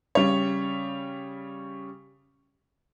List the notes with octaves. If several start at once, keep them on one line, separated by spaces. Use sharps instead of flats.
C#3 G3 C#5